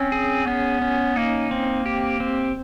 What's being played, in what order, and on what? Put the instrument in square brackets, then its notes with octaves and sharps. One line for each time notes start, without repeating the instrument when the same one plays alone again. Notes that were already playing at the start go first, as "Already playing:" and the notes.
Already playing: [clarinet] C4 [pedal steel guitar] C#4
[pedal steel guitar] G#4
[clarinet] B3 [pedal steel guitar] C#4
[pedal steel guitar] C#4
[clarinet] A#3 [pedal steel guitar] D#4
[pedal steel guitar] C4
G4
C4